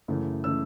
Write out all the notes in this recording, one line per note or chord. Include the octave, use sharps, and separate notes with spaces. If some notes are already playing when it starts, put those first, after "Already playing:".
F#2 C#3 E3 A3
C#3 E3 A3 E6